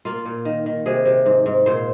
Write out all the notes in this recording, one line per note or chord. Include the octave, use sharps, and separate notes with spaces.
A#3 F4
A#2
D#3
D#3
C3 G#4
C3
G#2
G#2
A#2 C5